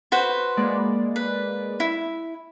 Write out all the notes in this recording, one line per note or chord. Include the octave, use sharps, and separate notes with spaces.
F#4 B4 C5
G#3 A#3 D5
B4
E4